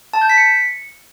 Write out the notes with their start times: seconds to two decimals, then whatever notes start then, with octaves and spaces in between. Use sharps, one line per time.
0.14 A5
0.21 G6
0.29 B6
0.37 C#7